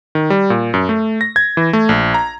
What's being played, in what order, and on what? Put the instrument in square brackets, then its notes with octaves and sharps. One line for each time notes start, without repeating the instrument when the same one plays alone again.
[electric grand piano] D#3
G3
A#2
F#2
A3
A#6
G#6
E3
A3
A#1
A#5